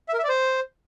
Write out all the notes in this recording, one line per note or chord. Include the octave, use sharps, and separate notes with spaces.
E5
A#4
E5
D5
C5